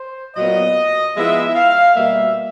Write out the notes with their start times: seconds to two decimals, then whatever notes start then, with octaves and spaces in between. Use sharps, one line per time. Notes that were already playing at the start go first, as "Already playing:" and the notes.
Already playing: C5
0.36 A#2 F#3 B3 D#5
1.15 F3 G#3 B3 E4 E5
1.55 F5
1.95 B2 G3 A#3 E5